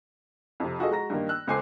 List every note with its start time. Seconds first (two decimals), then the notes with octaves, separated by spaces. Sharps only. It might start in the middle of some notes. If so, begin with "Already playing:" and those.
0.60 F2 C3
0.79 F4 F#4 G#4 A4 D#5
0.91 G#3 F#4 A#5 A#6
1.10 G2 D#3 A#3
1.29 E6 F#6
1.47 C#2 A4 C5 G#5 D6 C7